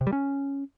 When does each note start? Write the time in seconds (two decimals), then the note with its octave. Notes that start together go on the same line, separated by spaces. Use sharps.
0.01 C3
0.07 G3
0.13 C#4